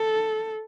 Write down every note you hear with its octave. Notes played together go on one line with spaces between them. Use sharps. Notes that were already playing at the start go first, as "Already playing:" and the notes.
Already playing: A4